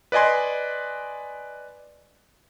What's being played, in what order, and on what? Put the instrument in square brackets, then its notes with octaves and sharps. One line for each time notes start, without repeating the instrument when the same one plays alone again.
[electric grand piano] B4 D5 D#5 G#5 C6